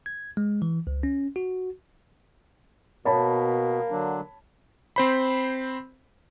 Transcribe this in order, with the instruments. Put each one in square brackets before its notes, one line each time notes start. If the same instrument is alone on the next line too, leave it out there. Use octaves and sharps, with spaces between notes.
[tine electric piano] G#6
G#3
E3
C#2
C#4
F#4
[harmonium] B2 [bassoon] A#3 [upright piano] C#5 A5 B5
[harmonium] D3 F#3 D4
[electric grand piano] C4 C5 B5